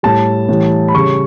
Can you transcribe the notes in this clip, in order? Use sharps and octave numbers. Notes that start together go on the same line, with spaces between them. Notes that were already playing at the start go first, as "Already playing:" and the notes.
A2 G3 A5
A2 E3 G3
B5
C#3 G3 C#6